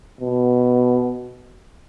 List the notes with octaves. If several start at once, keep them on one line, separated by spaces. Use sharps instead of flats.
B2